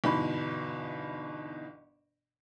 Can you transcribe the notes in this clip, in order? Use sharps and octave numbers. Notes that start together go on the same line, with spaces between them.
G1 G#2 B2 E3 B5